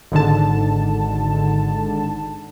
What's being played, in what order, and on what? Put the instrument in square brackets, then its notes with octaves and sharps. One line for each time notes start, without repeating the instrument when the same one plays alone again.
[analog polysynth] G#1 G#2 D3 A5